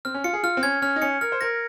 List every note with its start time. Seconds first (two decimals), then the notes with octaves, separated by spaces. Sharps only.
0.05 C4 F6
0.14 C#4
0.24 F4 C#7
0.33 G#4
0.43 F4 F6
0.57 C4
0.63 C#4 G#6
0.82 C#4 F6
0.96 D#4
1.02 C#4 C#7
1.21 A#4 F6
1.32 C5
1.41 A#4 A#6